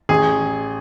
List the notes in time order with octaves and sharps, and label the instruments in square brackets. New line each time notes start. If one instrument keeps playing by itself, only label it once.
[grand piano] A1 G#4